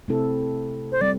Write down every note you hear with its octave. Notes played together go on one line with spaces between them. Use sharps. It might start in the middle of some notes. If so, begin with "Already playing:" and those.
C3 A3 C4 E4 A4
C5
G3 C4 D5